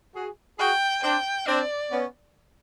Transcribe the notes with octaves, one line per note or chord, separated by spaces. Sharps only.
F#4 G#4
F#4 G#4 G5
C4 D4 G5
C4 D4 D5
B3 C#4